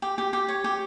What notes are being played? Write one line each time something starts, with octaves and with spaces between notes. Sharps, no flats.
G4
G4
G4
C#5
G4